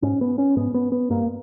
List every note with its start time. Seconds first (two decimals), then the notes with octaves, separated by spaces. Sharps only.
0.02 G#2 C#4
0.21 B3
0.38 C#4
0.57 G#2 B3
0.74 B3
0.92 B3
1.10 G2 A#3